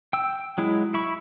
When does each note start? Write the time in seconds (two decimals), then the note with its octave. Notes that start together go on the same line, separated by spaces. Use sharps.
0.13 G5 E6
0.58 F#3 G#3 E4
0.94 E4 B5 C#6